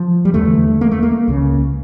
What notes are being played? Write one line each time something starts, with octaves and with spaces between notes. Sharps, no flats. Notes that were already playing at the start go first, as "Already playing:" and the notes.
Already playing: F3
G3
E2 D3 A3
A#3
A3
A#3
C#2 C#3